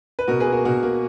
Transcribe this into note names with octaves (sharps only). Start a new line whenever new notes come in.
B4
B2 F#4 A#4
G#4 B4
A#3
F#4 A#4
B2 F#4 A#4
A#3